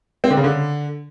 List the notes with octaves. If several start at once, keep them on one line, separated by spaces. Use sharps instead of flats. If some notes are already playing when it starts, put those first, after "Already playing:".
C4
D3
C#3
D3